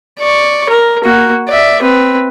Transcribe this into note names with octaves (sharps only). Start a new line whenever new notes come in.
D5 C#6
A#4
A#3 F#4
D5 E5
C4 B4